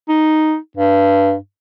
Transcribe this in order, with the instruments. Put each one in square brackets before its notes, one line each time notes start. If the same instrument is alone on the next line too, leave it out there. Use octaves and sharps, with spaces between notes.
[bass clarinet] D#4
G2